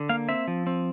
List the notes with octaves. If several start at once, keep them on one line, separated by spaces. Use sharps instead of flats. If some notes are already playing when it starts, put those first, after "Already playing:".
Already playing: D3
A#3 F5
C4 E5
F3
C4